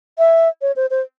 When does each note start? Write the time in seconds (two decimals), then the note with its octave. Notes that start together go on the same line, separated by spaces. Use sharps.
0.18 E5
0.62 C#5
0.76 C5
0.91 C5